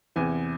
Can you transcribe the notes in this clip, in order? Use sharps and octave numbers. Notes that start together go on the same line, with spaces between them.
E2 C3 E3 G#5